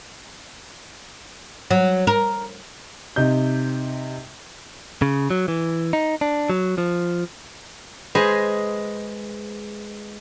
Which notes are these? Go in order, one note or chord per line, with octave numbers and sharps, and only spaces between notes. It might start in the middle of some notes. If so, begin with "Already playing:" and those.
F#3
A#4
C3 D#4 G6
C#3
F#3
E3
D#4
D4
F#3
F3
G#3 G#4 B4 C5 D#5